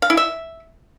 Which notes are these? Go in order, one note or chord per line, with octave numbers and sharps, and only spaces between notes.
F5
E4
E5